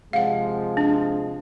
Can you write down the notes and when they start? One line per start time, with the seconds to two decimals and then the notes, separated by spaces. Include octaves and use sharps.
0.13 C3 F3 G#3 F5 F#5
0.77 D4